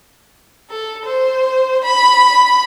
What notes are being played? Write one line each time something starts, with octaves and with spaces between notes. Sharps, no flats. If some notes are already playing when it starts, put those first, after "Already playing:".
A4
C5
B5